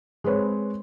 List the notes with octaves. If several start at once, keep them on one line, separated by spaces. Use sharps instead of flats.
G#3 C4 B4 C#5